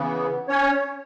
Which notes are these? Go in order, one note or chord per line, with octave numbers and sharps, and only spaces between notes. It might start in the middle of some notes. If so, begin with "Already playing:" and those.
Already playing: C#3 E3 B3
C#4 C#5